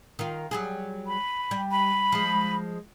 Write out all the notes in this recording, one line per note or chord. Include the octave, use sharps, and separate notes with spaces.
D#3 F4
F#3 G3 G#4
B5
G3
B5
F3 G#3